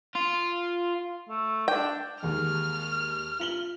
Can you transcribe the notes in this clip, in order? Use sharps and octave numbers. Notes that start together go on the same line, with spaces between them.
F4
A3
D4 G5
D#2 G#3 F6
F4 F#7 G7